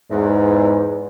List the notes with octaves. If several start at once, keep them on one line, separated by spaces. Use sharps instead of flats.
E2 G#2